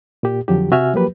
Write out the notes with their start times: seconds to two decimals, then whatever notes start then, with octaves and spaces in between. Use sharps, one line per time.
0.23 A#2 G4
0.48 F2 D3 F3 F#3 G4
0.71 C3 F#4 E5 F#5 G#5 F6
0.94 F3 F#3 A#3 G4 B4